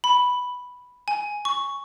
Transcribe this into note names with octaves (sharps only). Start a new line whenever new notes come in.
B5
G#5
C#6